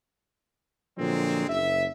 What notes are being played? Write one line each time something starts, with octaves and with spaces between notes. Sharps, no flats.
A#2 D3 F3 F#3 G#3 C4
F#1 E5